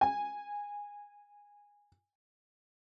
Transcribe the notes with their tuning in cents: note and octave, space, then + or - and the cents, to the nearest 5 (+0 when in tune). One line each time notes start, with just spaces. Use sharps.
G#5 -15